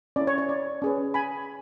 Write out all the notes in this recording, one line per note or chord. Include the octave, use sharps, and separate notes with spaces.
C#4 E4 A4 D5
C#5
C#5
D5
C#4 G#4 B4
G#5 B5